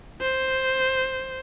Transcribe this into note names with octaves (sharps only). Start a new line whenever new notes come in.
C5